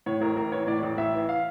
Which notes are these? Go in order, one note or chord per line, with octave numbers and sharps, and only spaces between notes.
A2 C#5
A1 A#4
A1 A#4
E3 C#5
A2 D5
A1
A1 E5
E3
F5